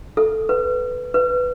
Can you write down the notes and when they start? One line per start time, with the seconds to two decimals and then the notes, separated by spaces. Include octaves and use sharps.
0.17 A4
0.49 B4
1.14 B4